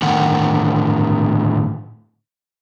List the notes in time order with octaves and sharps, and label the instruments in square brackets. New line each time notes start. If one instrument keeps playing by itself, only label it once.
[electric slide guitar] A2 D3 D#3 F#5 G5